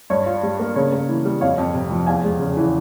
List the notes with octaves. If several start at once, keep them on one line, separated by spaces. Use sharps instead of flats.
G2 C#5
F4
G3
A#3
C#3 C#5
A#3
E3
G3
F2 C#5 F5
F2
C3
F3
E2 F5 G#5
G#3
C#3
E3